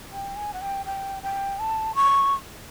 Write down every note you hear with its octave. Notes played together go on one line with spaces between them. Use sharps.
G5
G#5
F#5
G5
G5
G5
A5
C#6